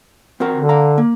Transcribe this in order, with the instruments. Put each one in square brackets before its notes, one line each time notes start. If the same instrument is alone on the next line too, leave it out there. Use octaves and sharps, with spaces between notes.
[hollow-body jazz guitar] C4 F#4 A#4
[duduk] D3
[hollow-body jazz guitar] F5 A#5
A#3